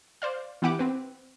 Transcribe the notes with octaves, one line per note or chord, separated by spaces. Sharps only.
C5 D5 F5
E3 B3 E4 G4 F#5 D6
C4 B4